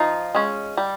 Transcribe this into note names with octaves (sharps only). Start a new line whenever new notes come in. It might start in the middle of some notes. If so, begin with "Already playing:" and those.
Already playing: F3 D#4 F4
G#3 C#4
G3